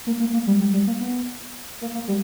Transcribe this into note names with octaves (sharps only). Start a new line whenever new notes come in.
A#3
A#3
A#3
G3
G3
G3
A#3
B3
A#3
A#3
G3